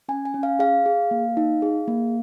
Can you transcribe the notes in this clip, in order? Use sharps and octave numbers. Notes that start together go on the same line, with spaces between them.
C#4 G#5
G#5
C#4
F5
G#4 F5
G#4
A#3
D#4
G#4
A#3